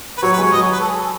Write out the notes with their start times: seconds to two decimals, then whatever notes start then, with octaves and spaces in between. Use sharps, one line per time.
0.18 B4
0.23 F#3 C#5
0.33 B4
0.38 G#3
0.43 C#5
0.53 F#3 D#5
0.62 C#5
0.72 B4
0.80 A4
0.88 G#4
0.96 A4